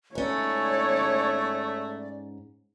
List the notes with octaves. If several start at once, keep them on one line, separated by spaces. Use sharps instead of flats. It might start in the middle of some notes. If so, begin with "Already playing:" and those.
G#2 A3 C#4 C#5 D5